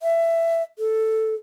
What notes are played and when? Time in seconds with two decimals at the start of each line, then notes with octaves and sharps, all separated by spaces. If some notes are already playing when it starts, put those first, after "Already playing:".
0.03 E5
0.79 A4